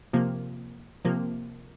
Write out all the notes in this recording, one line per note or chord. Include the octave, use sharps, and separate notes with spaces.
C3 F3 A#3
C3 F3 A#3